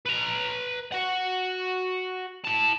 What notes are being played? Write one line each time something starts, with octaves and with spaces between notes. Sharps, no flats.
B4 A#5
F#4 F#5
E4 A5